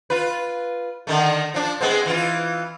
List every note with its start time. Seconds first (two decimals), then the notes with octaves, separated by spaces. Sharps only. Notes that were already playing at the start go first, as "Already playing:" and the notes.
0.10 F4 B4
1.07 D3 D#3 A3
1.54 F3 D4
1.80 G#3 B3 C4
2.06 E3 F4